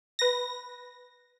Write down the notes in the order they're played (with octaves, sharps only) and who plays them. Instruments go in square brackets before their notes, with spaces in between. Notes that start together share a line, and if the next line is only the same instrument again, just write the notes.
[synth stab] B4 A#6